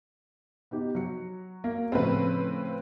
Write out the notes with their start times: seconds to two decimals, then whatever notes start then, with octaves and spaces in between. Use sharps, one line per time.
0.71 B3 D#4 G4
0.95 F#3 C#7
1.64 A#3
1.92 A2 C#3 F3 C4 B4